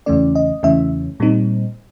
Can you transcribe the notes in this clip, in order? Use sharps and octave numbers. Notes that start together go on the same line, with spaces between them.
E2 C#3 E3 A3 C#4 D5
D#5
E2 C#3 E3 A3 C#4 E5
A#2 G3 C4 D#4